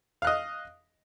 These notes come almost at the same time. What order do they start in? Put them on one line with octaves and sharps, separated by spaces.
F5 F#6 D#5